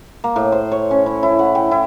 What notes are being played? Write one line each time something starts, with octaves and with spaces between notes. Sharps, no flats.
A#3
A2
C5
C#5
C#4
E4
E4
F#5
G5
E4